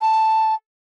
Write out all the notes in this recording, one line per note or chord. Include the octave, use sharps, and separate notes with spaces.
A5